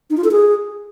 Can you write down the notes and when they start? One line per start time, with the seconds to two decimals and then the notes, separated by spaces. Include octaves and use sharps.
0.10 D#4
0.17 F4
0.24 A4
0.31 G#4